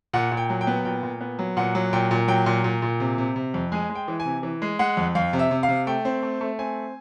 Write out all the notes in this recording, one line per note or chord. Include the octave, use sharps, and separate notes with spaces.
A#2 F#5
A#2
G5
F#3
G5
B3
A#2 G5
A#2
B3
F#3
A#2 F#5
F#3
A#2 G5
A#2
F#3 G5
A#2
A#2
A#2
C3
C3
C3
F2
G#3 G#5
G#3
G5
E3
G#5
C3
E3
G#3
G#3 F#5
F2
F2 F5
C3
E5
C3
F5
C3
A3 G5
C4
A3
A3
C4 G#5